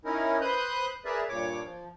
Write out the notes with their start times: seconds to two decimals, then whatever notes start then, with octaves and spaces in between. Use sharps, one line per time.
0.05 C#4 D#4 E4 A#4
0.41 B4 C5 D#6 F#6 G6
1.05 G#4 A#4 B4 D5 E5
1.29 G2 A#2 C#5 D6
1.64 F3